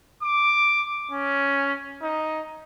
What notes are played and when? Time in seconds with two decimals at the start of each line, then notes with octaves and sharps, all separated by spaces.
0.23 D6
1.11 C#4
2.02 D#4